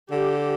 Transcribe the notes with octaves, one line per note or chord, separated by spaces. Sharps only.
D3 G4